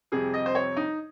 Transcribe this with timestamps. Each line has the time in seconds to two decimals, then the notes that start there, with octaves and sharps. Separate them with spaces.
0.12 F2 C3 G3 G#4
0.34 D#5
0.46 C5
0.55 C#5
0.76 D#4